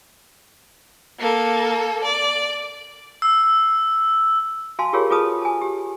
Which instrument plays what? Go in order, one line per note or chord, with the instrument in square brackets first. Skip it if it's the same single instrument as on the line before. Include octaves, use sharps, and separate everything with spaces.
[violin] A#3 A4
D5
[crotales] E6
[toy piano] F#4 F5 G#5 A5 C6
F4 G4 G#4 A#4 C#5 F5
F4 F#4 G#4 B4 A5 D#6
G#5 A5
G4